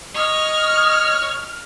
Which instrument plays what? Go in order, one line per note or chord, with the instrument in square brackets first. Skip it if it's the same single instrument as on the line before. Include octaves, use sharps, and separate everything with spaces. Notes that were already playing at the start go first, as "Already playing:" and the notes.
[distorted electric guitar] C#5 [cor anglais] D#5 [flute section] D#6 [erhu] F6